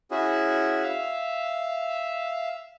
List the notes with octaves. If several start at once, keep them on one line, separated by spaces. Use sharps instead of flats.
C#4 E4 F#4 G#4
E5 F5